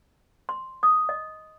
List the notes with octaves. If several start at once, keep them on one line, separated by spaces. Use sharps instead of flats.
C6
D#6
D#5